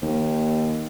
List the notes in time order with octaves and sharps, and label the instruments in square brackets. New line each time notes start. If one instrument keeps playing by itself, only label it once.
[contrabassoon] D#2